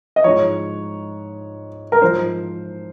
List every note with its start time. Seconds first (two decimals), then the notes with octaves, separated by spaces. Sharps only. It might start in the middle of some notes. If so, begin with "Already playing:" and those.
0.16 D#5
0.24 G#2 F3 C#5
1.92 A#4
2.02 G#2 F3 C5